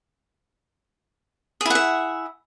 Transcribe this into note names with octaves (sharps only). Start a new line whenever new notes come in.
E4 G#4 E5 F#5